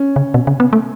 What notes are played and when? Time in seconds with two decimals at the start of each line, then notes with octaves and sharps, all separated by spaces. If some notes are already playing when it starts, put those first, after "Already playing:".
Already playing: C#4
0.16 C#3
0.34 B2
0.47 C#3
0.60 B3
0.73 A3